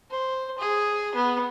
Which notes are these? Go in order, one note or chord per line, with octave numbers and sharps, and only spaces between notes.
C5
G#4
B3